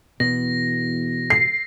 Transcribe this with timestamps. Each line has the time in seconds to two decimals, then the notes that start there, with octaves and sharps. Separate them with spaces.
0.20 E2 B2 A#6
1.30 C7